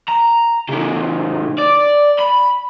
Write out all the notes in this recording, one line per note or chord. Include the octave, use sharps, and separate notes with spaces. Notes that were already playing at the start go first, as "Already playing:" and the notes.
A#5
C#3 E3
D5
B5